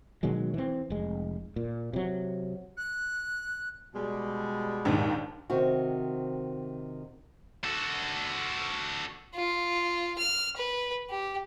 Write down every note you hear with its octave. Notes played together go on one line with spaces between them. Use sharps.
B2 D#3 F#3 G#3
E3 C4
F1 G#3
A#2
C3 F#3
F#6
B2 G3 G#3
A#1 D#2 G#2
C3 D#3 C4 F#4
F#4 A4
F4
F6
B4
G4